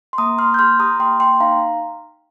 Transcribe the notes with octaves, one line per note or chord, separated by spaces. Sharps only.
C6
A#3 A#5 D#6
A#3 C6 F6
G6
G4 C6 F6
G4 A#5 D#6
A#3 G5 C6
A#3 G5 C6
D#4 F5 A#5